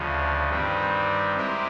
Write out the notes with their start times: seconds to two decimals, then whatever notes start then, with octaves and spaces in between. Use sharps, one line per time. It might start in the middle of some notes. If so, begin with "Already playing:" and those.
Already playing: D2 C#3 F3
0.49 G2 D#3 G3 C4
1.37 G#3 C4 E4 G4 A#4